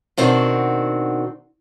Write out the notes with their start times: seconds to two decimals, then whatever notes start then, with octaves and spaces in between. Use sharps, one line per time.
0.17 B2 D#3 C4 D4 F#4